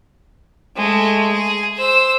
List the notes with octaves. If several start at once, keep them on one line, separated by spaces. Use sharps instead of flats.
G#3 A3
G#4
C5 E6